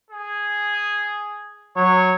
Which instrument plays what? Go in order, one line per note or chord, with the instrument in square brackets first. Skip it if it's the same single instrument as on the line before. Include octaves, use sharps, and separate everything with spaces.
[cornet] G#4
[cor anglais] F#3 [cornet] C#5